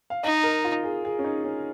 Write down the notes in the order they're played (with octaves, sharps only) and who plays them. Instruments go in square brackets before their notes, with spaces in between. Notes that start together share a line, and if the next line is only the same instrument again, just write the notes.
[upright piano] F5
[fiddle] D#4 [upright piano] D#5
[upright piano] A#4
F4
G#4
G#4
C#4
D#4
C#4